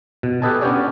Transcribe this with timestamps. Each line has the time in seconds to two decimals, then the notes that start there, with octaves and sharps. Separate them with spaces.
0.23 B2
0.42 G4 A4 B4 D#5 G#5 A5
0.61 B3 C#4 D4 G4 C#5 D5